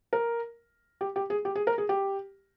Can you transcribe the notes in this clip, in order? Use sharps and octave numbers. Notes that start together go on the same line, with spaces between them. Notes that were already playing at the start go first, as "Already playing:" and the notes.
A#4
G4
G4
G#4
G4
G#4
A#4
G#4
G4